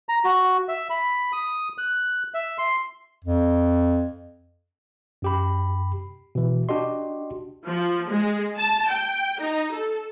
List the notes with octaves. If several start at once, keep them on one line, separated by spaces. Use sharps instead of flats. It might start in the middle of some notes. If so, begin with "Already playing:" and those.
A#5
F#4
E5
B5
D#6
F#6
E5
C6
F2
F#2 G4 B5
B2 E3
D4 F#4 G4 D#5 C6
F3
G#3
A5
G5
D#4
A4